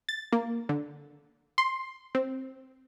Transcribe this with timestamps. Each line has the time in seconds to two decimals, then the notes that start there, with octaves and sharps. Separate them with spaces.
0.09 A6
0.32 A#3
0.69 D3
1.58 C6
2.15 C4